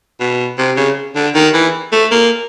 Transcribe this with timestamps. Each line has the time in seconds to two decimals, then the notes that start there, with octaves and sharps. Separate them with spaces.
0.20 B2
0.58 C3
0.77 C#3
1.16 D3
1.35 D#3
1.54 E3
1.92 A3
2.11 A#3